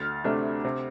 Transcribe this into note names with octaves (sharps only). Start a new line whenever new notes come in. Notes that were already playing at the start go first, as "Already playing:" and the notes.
Already playing: D2 F6 A6
C3 A3 D4
C3